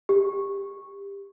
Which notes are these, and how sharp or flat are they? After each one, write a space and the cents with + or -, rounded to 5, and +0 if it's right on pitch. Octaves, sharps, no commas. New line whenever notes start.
G4 +25